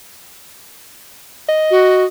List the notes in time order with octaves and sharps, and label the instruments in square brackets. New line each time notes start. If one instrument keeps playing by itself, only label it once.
[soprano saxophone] D#5
[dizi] F#4